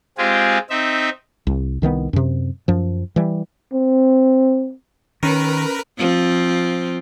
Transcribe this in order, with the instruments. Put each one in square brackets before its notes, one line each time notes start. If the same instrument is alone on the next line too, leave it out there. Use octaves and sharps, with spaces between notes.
[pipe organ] G#3 C4 F4 G4 G#4
C4 D#4 E5
[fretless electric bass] C2
C2 D#3 E3 B3
F#2 C3
F#2 F3
E3 G3
[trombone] C4
[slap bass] D#3 [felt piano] C#4 [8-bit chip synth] A#4 B4
[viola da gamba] F3 C4 F4